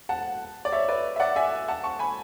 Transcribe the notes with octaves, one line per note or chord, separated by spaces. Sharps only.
F#5 A5
D5
C#5 E5
B4 D5
E5
D5 F#5
E5 G#5
F#5 A5
A5 C#6
G#5 B5